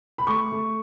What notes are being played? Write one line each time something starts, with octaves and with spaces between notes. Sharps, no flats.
B5
A3 C#6
A3